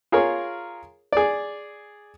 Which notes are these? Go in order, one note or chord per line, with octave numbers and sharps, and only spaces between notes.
F4 G#4 A#4 C#5
G#4 D5